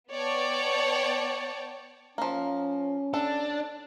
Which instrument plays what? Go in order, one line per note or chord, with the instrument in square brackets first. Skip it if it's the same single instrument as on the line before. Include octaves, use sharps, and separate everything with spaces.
[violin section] B3 C#5 D5 G5 A5
[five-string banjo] F3 A#3 [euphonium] C#4
[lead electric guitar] D4 [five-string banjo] A4